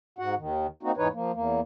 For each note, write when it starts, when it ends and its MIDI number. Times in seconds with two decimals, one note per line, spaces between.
0.19 0.35 44
0.19 0.35 66
0.19 0.35 78
0.37 0.67 39
0.37 0.67 51
0.83 0.92 58
0.83 0.92 60
0.83 0.92 63
0.83 0.92 66
0.97 1.08 40
0.97 1.08 44
0.97 1.08 52
0.97 1.08 63
0.97 1.08 71
0.97 1.08 73
1.13 1.32 53
1.13 1.32 58
1.34 1.61 40
1.34 1.61 58